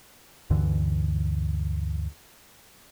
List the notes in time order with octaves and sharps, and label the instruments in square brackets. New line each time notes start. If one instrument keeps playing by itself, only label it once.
[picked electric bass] D2 G2 D3 E3